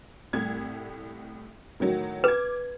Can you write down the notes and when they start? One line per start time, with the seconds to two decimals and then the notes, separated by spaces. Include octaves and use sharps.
0.33 C2 A2 G#6
1.80 A2 D#3 F#3
2.24 B4 D6 G#6